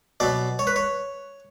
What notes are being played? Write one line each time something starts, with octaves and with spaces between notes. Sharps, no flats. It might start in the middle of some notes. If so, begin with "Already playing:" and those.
B2 F#3 D5
C#5
B4
C#5